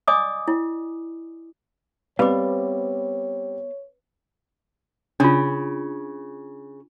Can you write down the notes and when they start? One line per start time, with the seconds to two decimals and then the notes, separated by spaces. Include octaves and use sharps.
0.08 D5 D#5 G#5 D6 D#6
0.48 E4
2.19 G3 B3 C4 B4 C#5 D5 F5 D6
5.20 C#3 D4 F4